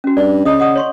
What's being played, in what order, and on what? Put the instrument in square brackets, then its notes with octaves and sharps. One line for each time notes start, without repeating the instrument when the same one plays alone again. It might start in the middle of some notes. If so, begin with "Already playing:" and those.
[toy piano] C#4 F#4
[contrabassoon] G2 [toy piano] D5
[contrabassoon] C#3 [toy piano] D#5 D#6
[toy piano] D#5 F#5 D#6
C#5 C6 C#6